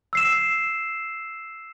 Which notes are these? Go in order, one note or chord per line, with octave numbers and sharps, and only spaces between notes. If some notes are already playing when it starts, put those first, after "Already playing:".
E6 C7 E7